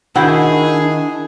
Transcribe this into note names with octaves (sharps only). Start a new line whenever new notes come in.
D#3 D4 E4 F#4 G#4 G5